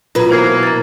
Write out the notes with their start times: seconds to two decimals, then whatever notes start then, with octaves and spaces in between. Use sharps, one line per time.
0.15 B2 F#3 F4 B4 A#5
0.30 E3 A#3 C5 G#6 C7
0.63 A#5 A6